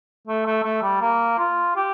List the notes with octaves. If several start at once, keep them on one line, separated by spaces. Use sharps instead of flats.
A3
A3
A3
G3
A#3
F4
G4